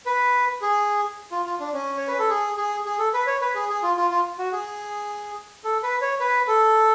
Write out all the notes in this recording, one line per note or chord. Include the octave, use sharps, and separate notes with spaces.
B4
G#4
F4
F4
D4
C#4
C#5
B4
A4
G#4
G#4
G#4
A4
B4
C#5
B4
G#4
G#4
F4
F4
F4
F#4
G#4
A4
B4
C#5
B4
A4